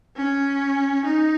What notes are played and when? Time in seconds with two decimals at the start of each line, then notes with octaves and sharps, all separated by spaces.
0.17 C#4
1.05 D#4